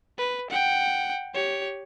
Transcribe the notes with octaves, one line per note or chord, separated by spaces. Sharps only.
B4
F#5 G5
G4 C#5